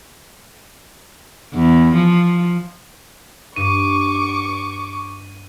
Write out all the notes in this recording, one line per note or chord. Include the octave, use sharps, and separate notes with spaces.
E2
F3
G2 C#6 D6 D#7